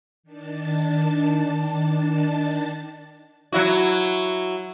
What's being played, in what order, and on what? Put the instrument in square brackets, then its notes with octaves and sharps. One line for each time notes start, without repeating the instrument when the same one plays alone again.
[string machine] D#3 D4 A5
[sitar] F#3 E4 F#4